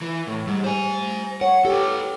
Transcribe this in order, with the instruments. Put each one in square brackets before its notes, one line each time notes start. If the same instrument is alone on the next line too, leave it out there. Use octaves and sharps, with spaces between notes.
[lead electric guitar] E3
A2
[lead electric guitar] G#2 [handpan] G3
[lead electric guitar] C5 G#5
[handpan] C#5 [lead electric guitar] F#5
[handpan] G4 [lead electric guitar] A4 B4